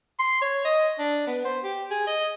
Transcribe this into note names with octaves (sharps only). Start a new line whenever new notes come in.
C6
C#5
D#5
D4
B3
C5
G4
G#4
D#5